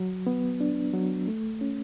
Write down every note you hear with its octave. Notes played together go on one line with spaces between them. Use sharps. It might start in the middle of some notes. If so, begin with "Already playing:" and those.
Already playing: F#3
B3
D4
F#3
A3
C#4